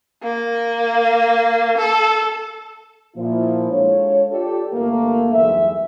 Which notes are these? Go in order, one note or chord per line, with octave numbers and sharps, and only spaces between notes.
A#3
A4
A#2 F3 E4
G#3 D4 F4 A4 C#5
F4 G4 A4 D5
G1 A3 A#3 A#4
B1 E2 G2 G#3 E5